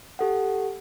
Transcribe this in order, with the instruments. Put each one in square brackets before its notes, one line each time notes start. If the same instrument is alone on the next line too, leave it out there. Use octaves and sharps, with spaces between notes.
[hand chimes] G4 A4 F#5